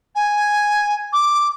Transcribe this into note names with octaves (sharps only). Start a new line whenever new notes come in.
G#5
D6